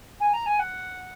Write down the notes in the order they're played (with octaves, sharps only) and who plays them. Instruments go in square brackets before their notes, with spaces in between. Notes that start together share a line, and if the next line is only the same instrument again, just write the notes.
[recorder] G#5
A#5
G#5
F#5